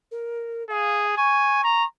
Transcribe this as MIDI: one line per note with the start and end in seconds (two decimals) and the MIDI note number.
0.11 0.63 70
0.70 1.17 68
0.70 1.03 77
1.17 1.62 80
1.17 1.85 85
1.64 1.84 82